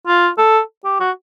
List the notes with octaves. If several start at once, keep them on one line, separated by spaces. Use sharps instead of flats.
F4
A4
G4
F#4